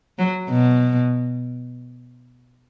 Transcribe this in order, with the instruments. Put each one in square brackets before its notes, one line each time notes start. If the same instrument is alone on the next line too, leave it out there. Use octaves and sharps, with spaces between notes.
[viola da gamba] F#3
B2